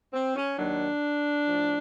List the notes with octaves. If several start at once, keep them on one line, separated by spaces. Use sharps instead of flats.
C4
C#4
D#2 D#3 F#3 D4
A2 F3